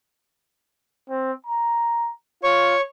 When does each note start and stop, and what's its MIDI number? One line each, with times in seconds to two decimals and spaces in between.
1.09 1.32 60
1.46 2.11 82
2.43 2.75 65
2.43 2.81 73
2.43 2.81 85